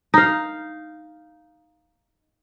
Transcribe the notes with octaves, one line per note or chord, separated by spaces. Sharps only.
D#4 F5